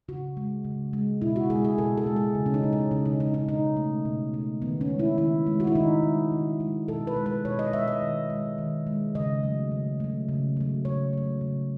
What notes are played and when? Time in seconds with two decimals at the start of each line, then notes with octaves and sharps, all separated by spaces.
0.08 C#3 F#4
0.37 G#3
0.65 C#3
0.93 G#3
1.22 B2 E4
1.36 F#4
1.50 G#3 G#4
1.65 G#4
1.78 B2 A4
1.97 A4
2.06 G#3
2.16 G#4
2.35 C#3
2.46 C#4
2.54 D#4
2.63 G#3
2.73 C#4
2.91 C#3 C#4
3.06 D#4
3.20 G#3 D#4
3.34 D#4
3.49 B2 D#4
3.77 A3
4.05 B2
4.34 A3
4.62 D#3 B3
4.81 C#4
4.90 G#3
4.99 E4
5.18 D#3 E4
5.47 G#3
5.60 F#4
5.67 E4
5.75 D#3 D#4
6.03 G#3
6.32 D#3
6.60 G#3
6.88 B2 A4
7.07 B4
7.16 G#3
7.26 B4
7.45 B2 C#5
7.59 D#5
7.73 G#3 E5
7.88 D#5
8.02 D#3
8.30 G#3
8.58 D#3
8.87 G#3
9.15 C#3 D#5
9.43 F#3 A3
9.72 C#3
10.00 F#3 A3
10.29 C#3
10.57 F#3 A3
10.85 C#3 C#5
11.13 F#3 A3
11.41 C#3